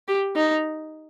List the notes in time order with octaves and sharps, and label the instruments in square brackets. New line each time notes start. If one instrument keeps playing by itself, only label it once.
[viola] G4
D#4